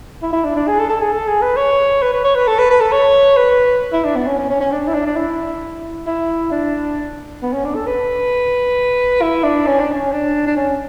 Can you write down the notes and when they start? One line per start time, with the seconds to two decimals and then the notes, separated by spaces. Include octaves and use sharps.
0.22 E4
0.33 E4
0.45 D4
0.56 D4
0.68 G#4
0.79 A4
0.90 A4
1.01 G#4
1.12 A4
1.28 G#4
1.42 B4
1.57 C#5
2.02 B4
2.14 B4
2.24 C#5
2.35 B4
2.47 A4
2.58 B4
2.70 B4
2.80 A4
2.92 C#5
3.37 B4
3.93 E4
4.05 D4
4.16 B3
4.27 C#4
4.39 C#4
4.50 C#4
4.61 C#4
4.72 D4
4.88 E4
4.94 D4
5.07 D4
5.16 E4
6.06 E4
6.51 D4
7.42 B3
7.53 C#4
7.65 D4
7.75 A4
7.87 B4
9.22 E4
9.44 D4
9.67 C#4
9.80 D4
9.92 C#4
10.12 D4
10.47 D4
10.56 C#4